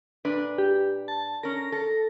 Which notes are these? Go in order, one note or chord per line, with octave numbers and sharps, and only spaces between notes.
A#2 D4 B4
G4
A5
C#4 A#4 A#6
A4